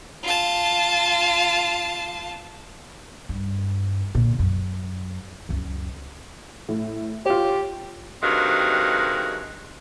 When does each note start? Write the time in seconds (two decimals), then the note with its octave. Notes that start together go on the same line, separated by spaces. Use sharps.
0.23 F4 A5
3.29 G2
4.15 A#2 D3
4.39 F#2
5.49 C#2 F#2
6.69 A2
7.26 F4 G4 C#5
8.23 G2 C3 D#3 G#3 F#4 F5